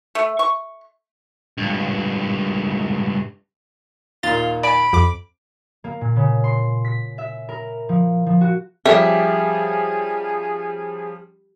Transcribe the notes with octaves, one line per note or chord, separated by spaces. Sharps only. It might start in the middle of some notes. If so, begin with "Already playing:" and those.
A3
C#6
C#2 G2
D#2 A#2 F4 A6
D5 G#5 B5 D7
F2 D6
A#3
A#2
C#3
C6
B6
E5
A#4
F3
F3
F#4
F3 G3 C#4 G4 G#4 E5